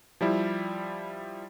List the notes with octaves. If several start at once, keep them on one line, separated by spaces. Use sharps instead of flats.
F3 G3 E4